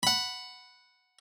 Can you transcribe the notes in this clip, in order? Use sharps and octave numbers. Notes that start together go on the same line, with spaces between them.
F#5 B5